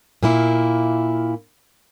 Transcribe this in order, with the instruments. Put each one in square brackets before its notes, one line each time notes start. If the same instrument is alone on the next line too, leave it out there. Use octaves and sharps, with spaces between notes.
[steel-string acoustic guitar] A#2 A#3 E4